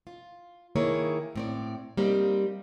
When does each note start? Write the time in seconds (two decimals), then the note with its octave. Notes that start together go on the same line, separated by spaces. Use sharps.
0.07 F4
0.76 D#3 A#3 E4 G#4 C#5
1.36 A2 C4 D5
1.97 G3 A#3 C4 D#4 G4 C5